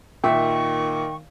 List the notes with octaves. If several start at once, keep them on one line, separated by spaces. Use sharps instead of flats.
A#2 D#3 E5 G5 C#6